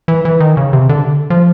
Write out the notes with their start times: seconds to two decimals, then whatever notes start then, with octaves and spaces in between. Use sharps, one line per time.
0.08 E3
0.25 E3
0.40 D#3
0.57 C#3
0.73 C3
0.89 D3
1.30 F3